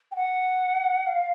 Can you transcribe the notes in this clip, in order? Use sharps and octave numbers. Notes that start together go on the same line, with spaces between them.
G5
F#5
F5